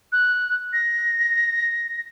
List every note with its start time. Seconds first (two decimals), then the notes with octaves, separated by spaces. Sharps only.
0.12 F#6
0.73 A#6